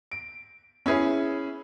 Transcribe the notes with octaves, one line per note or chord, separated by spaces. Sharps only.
D7
C#4 E4 G#4 B4